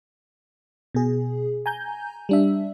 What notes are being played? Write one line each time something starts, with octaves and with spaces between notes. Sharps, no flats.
B2 G#4
G#5 A#5 G6
G3 D4 E5